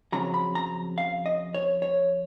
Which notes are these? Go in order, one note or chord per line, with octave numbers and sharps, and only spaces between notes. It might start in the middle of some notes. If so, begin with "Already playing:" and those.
F2 C#3 F#3 A#5
B5
A#5
F5
D#5
C#5
C#5